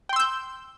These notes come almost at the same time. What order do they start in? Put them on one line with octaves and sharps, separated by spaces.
G5 C6 E6 G6